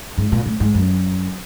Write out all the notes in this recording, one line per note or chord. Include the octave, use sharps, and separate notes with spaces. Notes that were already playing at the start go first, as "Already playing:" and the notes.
G#2
A#2
A2
G#2
F#2